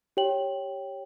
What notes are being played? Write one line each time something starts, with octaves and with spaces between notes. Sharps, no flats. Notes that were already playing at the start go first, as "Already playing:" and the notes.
G4 C#5 G5 F#7